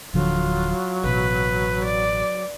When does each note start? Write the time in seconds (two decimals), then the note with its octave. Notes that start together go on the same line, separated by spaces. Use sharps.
0.14 D1 D3 F3 F#3 F4
1.04 A1 B2 B4
1.85 D5